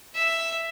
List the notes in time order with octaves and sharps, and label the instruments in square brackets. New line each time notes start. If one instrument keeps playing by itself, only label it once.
[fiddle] E5